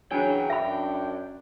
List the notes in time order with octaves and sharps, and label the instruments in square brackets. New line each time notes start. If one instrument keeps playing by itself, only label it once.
[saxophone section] C#3 E3 F#3 [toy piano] D4 [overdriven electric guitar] G5
[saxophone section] F#2 D4 [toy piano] E5 B5